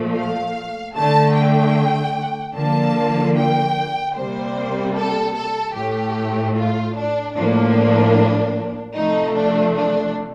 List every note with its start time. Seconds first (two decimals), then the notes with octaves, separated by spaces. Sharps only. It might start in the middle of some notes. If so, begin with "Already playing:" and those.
Already playing: A#2 F3 A3
0.15 F5
0.94 D3 A3 A5
1.35 G5
2.55 D3 F3 A#3 A5
3.35 G5
4.15 C3 G3 A#3 C5
4.95 A4
5.35 A4
5.75 A2 A3 G4
6.55 F4
6.96 D4
7.36 A2 F3 A#3 D4
8.96 C3 F3 A3 D#4
9.36 D4
9.76 D4